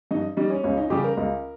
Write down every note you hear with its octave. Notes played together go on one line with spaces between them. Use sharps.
G2 D#4
G3 D#4
C#4
C#2 C#4
D#4
C#3 G3 G4
A#4
C#2